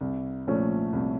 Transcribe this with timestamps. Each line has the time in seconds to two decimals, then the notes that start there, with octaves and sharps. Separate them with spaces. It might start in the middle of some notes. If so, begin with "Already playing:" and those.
0.01 C2
0.47 A#2 F3 A3 C#4
0.93 C2